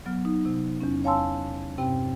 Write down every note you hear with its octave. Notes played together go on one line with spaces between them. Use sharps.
F#3 B3 F6
D#4
C3
E2 C#4
C#5 F5 G#5 A5 C6 E6
G2 C3 C4 G5